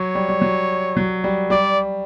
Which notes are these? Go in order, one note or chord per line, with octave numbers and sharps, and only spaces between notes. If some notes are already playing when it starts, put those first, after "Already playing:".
Already playing: F#3 C#5
G3
G3
F#3
F#3
G3
G3 D5